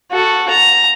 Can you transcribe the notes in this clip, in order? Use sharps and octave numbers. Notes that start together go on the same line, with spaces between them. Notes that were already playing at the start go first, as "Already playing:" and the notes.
F#4 A4
A#5